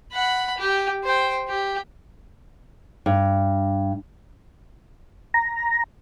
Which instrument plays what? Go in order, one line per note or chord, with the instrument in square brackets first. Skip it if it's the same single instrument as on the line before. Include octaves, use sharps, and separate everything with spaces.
[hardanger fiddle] F#5 B5
G4
C5 G5
G4
[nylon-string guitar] G2
[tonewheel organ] A#5